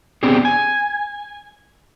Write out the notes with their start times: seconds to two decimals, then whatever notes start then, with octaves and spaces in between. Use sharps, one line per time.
0.23 B3 C4 D4 G4 G#4
0.45 G#5